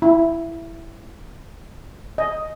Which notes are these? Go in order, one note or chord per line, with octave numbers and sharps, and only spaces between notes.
E4
D#5